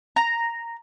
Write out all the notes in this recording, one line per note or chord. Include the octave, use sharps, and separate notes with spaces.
A#5